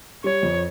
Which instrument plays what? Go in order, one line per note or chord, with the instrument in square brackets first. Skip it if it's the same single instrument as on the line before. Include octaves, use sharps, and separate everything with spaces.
[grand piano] G3 [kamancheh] C#5
[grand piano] F2